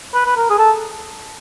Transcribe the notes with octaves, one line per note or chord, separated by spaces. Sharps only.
B4
B4
A#4
G#4
A4